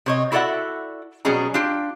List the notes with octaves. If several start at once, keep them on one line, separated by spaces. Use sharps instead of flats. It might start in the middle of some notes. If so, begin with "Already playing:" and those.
C3 C#5 D#5
E4 F#4 A4 D5 E5 F#5
B2 F#3 G3 C#4 G#4 A#5
D4 F4 G4